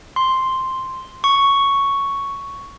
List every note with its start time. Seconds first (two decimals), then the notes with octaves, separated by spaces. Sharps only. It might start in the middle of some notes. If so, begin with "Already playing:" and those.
0.16 C6
1.24 C#6